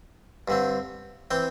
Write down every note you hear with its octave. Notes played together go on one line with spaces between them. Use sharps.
G2 D3 C4
E3 C4 G5